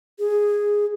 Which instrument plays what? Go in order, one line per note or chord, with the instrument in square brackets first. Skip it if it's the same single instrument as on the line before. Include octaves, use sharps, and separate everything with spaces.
[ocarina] G#4